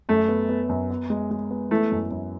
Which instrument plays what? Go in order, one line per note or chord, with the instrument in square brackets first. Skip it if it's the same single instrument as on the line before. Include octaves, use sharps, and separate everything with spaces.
[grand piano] F#2 [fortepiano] A3
[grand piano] B3
B3
F#2
B3
G#3
G#3
B3
[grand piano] E3 [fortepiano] A3
[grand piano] F#2
F#2